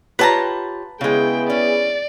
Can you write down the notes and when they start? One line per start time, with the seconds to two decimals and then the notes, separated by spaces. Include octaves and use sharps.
0.19 F4 G4 B4 C#5 A5 A#5
1.01 C#3 G#3 B3 E4 G#4 G5
1.50 C#4 D5